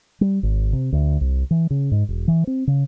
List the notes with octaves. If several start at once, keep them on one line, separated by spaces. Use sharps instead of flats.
G3
G#1
C3
D2
C2
E3
C#3
G#2
E1
E3
C4
C#3